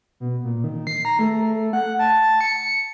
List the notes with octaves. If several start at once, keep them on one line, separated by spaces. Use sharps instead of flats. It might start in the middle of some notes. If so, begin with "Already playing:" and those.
B2
A#2
D#3
C7
A#5
A3
F#5
A5
C#7